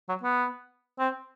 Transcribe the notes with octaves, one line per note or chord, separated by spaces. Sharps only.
F#3
B3
C4